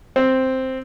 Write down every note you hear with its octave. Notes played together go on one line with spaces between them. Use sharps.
C4